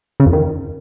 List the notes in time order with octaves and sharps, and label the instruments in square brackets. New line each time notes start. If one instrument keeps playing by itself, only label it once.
[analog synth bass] C#3
F2
D#3